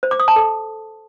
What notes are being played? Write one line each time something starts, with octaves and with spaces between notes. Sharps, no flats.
C5
D6
D#6
A5
A4